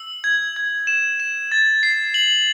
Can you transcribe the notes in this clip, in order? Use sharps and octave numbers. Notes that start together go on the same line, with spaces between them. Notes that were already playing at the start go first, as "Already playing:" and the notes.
Already playing: E6
G#6
G#6
E7
E7
A6
C7
F#7